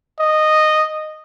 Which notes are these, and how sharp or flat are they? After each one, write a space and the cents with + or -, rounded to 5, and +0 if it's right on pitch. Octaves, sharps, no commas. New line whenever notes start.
D#5 -10